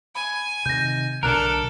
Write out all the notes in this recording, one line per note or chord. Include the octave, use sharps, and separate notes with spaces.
G#5 B5
C3 D#3 G6 A#6
B1 B2 D3 D4 A4 A#4 A#5 F#6